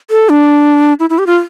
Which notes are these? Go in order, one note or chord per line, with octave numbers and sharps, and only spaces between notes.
A4
D4
E4
E4
G4
F4